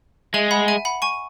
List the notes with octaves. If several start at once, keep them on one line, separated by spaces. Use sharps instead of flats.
G#3 E5 G#5
F#5 B5
E5 G#5
F#5 B5
G#5 C#6